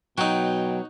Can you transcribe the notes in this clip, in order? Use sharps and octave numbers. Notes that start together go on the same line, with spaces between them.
B2 F#3 D#4 F#4 G5